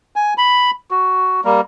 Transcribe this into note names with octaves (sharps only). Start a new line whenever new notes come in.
G#5
B5
F#4
G3 A#3